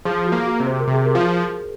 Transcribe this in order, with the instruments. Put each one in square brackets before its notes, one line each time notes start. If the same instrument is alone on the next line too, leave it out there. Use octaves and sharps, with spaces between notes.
[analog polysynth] F3 [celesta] G#4
[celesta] F#4
[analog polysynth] A#3
[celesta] F#4
[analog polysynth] C3
[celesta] C5
A#4
[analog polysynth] C3
[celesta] G#4
A#4
[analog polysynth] F3